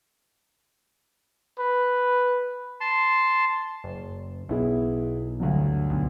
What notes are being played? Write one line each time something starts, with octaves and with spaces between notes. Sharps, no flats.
B4
A5 C6
F#1
B1 B3 E4 G#4
D2 G2 F#3
B1